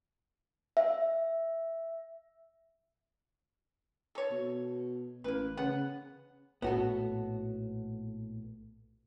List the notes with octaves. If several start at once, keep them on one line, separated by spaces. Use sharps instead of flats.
E5
A4 C#5
B2
A1 A#3 B4
C#3 B3 F#5
A#1 A2 B3 F#4 A4